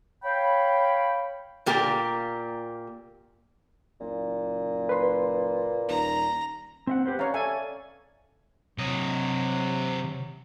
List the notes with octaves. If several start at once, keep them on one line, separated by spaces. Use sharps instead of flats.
C#5 F5 G5 B5
A#2 A#3 G4
F#1 A#2
B4 C6
D#1 A#5
C4 E5 F#5
G4 B4 C5
C#4 C#5 D5 F5 A#5
A4 D5 E5 G#5
C3 F#3 D#5